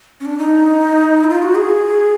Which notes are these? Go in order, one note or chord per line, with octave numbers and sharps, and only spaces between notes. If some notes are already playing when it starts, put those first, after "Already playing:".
C#4
D4
D#4
E4
F4
F#4
G#4